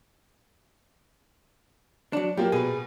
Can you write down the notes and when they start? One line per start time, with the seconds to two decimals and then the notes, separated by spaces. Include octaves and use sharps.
2.13 F#3 D4
2.37 F#2 A#3 F4 G4
2.52 B2 G#4 B4